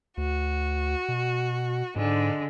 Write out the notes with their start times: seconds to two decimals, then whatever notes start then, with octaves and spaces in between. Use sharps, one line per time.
0.17 D2 F#4
1.08 B2
1.96 G#2 D3 G#3